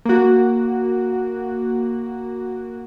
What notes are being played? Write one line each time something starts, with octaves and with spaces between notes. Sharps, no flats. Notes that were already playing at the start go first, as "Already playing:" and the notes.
A#3 F#4